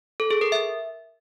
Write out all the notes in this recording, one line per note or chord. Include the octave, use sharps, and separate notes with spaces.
A4
G#4
A#4
E5